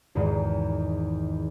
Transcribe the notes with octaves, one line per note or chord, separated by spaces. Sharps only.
G#1 E2 G#2 D#3